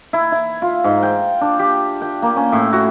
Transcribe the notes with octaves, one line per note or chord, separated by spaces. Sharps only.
E4
E4
F4
G#2
G5
D4
G4
G5
A#3
C#4
A2
F#4